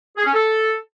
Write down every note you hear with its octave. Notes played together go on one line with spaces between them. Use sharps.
G#4
C#4
A4